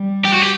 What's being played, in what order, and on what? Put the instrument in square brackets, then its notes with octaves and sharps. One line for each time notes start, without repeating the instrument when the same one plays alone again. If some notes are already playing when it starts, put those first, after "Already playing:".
Already playing: [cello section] G3
[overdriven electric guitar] G4
F#4
G4